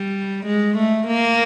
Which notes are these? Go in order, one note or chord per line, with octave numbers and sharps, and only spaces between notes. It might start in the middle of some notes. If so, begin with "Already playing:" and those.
Already playing: G3
G#3
A3
A#3